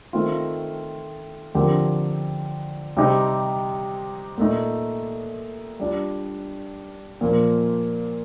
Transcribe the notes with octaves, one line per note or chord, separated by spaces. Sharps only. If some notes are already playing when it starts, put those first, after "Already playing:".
D#3 A3 C4 F4
D3 F3 C4 G4 A#4
C3 G3 C4 D#4 G4
A#2 A3 D#4
G3 D4 F4
A#2 F3 A#3